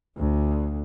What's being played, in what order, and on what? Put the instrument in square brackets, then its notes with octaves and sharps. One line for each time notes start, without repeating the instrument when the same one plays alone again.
[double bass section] D2